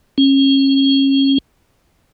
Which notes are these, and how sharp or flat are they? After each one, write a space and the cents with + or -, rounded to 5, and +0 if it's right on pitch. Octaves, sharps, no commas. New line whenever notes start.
C#4 -30